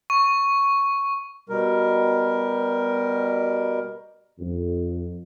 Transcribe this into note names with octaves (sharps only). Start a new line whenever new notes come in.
C#6
B2 G3 A#4
F2